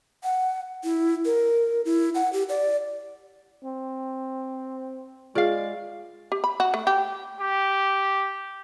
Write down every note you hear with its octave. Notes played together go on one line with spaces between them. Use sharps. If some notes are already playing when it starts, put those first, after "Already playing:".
F#5
E4
A#4
E4
F#5
G4
D5
C4
G#3 F4 G#4 D5 F5
G4
B5
F#4
A3
G4
G4